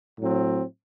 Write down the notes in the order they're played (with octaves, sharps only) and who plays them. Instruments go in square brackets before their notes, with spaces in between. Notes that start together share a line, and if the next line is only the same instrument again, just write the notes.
[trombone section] A2 F#3 C4